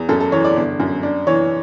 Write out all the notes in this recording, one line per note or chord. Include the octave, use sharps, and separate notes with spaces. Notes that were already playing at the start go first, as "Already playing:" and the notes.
Already playing: E2
F#2 A4
A4
E3 C#5
D5
G1
F#2
D4
E3 C#5